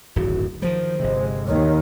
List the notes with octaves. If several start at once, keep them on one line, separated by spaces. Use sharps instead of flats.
D1 G#1 F#2 F#4
D#3 F3 G3 C5
G1 C3 G#3
D#2 D#3 C#5